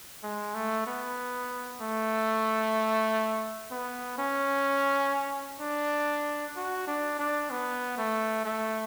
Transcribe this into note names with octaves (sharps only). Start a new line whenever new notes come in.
G#3
A3
B3
A3
B3
C#4
D4
F#4
D4
D4
B3
A3
A3